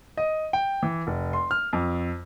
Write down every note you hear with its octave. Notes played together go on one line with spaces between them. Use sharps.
D#5
G5
E3
F1
C6
F6
F2